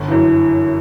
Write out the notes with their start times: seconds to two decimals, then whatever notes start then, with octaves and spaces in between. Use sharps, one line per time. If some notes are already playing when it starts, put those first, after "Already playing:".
Already playing: G1
0.08 F#2 E3